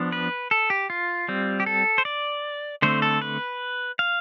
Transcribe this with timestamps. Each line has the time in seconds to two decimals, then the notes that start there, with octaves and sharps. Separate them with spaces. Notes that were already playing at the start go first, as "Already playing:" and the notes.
Already playing: F3 B3 D4
0.12 B4
0.51 A4
0.70 G4
0.90 F4
1.28 G3 C4
1.60 G4
1.66 A4
1.98 C5
2.05 D5
2.82 D3 A3 C4 C5
3.02 A4
3.21 B4
3.99 F5